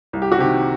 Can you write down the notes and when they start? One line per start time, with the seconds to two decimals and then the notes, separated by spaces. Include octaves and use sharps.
0.13 C2
0.22 G4
0.32 F#4
0.38 C3 D#3 G4